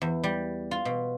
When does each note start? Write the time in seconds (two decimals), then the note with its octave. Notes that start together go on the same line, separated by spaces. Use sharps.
0.02 E2
0.24 G3
0.71 F4
0.85 B2